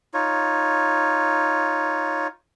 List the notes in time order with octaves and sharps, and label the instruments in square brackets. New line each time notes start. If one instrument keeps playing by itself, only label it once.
[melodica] D#4 F4 C#5